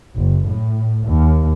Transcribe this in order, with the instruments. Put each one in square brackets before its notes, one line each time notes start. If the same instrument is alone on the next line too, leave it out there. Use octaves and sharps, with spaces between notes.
[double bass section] F#1
A2
D#2